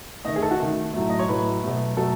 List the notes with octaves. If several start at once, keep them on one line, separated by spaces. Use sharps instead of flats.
D#3 A3 D#5
G#4
A4
F#4
D#3 A3
A2 F#3 A3
D#5
C#5
A2 F#3 A3 B4
B2 F#3 A3
B2 F#3 A3 A4